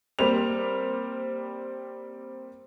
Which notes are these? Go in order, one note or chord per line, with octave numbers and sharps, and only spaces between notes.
G3 A#3 C4 F7